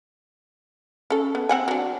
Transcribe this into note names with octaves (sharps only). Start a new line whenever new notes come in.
C#4 A4
B3
C4 F#5 G#5
F#3 D4